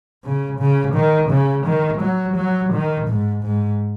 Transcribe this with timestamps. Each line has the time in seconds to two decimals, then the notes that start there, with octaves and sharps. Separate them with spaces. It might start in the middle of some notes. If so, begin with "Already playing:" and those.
0.24 C#3
0.59 C#3
0.94 D#3
1.30 C#3
1.65 D#3
2.01 F#3
2.36 F#3
2.72 D#3
3.07 G#2
3.43 G#2